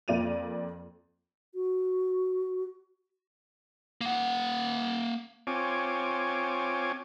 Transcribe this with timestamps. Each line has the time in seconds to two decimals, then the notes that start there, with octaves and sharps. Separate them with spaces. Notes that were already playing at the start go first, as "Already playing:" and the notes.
0.08 F2 A#3 F4 D5 D#7 F7
1.53 F#4
4.01 A#3 F#5
5.47 C4 F4 C#5 G#5 D6